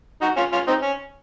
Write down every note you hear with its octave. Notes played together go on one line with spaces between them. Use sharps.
D#4 F#4
C#4 F4
C#4 F4
C4 D#4
C#4